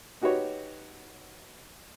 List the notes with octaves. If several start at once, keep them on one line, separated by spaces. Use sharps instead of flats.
D#4 F#4 G4 B4 C#5